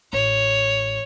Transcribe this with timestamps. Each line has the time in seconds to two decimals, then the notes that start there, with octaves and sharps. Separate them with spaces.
0.13 A1 C#5